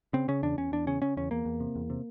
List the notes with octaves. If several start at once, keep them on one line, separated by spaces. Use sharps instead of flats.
C#3 C4
C#3 C#4
E2 D4
E2 C#4
E2 D4
C#3 C#4
C#3 C#4
E2 C#4
E2 A#3
E2
C3
E2
C3